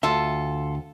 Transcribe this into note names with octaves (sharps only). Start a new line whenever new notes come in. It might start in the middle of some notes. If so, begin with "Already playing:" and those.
D2 F4 A4 E5